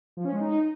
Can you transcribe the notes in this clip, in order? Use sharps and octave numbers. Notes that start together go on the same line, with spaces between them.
F3
C#4
G#3
D#4